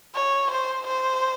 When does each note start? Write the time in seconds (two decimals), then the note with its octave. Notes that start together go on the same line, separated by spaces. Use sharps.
0.14 C#5
0.51 C5
0.87 C5